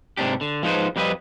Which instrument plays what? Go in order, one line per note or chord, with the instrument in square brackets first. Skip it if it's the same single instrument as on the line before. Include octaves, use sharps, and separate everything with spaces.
[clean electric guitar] G#2 C3 D4 G4
D3
F3 G#3 D#4 B4 C5
F2 G3 C4 B4 D#5